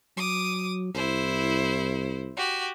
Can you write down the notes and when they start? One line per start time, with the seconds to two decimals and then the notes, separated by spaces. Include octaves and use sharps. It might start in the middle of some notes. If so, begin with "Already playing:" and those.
0.17 F#3 D6 D#6
0.94 C2 E4 C5
2.37 F#4 G4